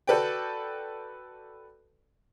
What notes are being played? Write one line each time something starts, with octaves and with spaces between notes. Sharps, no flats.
F#4 A4 B4 D5 G5